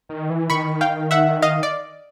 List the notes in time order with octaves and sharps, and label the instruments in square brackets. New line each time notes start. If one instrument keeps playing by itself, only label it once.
[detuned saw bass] D#3
E3
[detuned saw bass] D#3 [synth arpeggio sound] B5 C#6
[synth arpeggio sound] F5 G5
E5 F#5
D#5 F5
D5